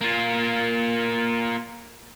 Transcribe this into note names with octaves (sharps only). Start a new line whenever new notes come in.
A#3 F4